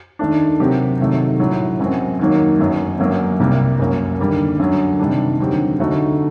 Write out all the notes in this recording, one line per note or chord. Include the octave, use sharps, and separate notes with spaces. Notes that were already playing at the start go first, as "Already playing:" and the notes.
D#2 D#3 A3 D4
C3 F#3 C4 G4 A#4
C3 D#3 F#3 A3
A#1 A2 F#3
F#1 F#2 F#3 C4
D#2 D#3 F#3 A#3
G1 F#2 F#3
G1 F#2 F#3 A#3
C2 C3 G3 A#3
F#1 F#2 F#3 A#3
D#2 D3 G3 A#3
F#2 D3 F#3
C3 D#3 G3 D4
D#2 D3 F#3 C4 G4
D2 D3 A3 D#4 F#4